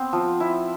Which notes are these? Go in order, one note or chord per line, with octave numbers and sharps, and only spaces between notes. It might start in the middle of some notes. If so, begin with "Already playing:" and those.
Already playing: B3 C4
F3
E4